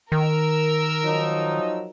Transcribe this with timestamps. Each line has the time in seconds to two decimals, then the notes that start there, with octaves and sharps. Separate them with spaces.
0.12 D#3 A#4 E6
1.04 F3 F#3 D#4